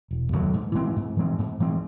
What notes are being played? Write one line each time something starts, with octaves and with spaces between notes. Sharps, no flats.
E1
D#2 D3 F#3
G#2
E3 G#3 C4
G#2
E3 G#3 C4
G#2
E3 G#3 C4